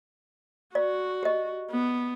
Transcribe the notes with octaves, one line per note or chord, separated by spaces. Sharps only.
F#4 D5
G4 D#5
B3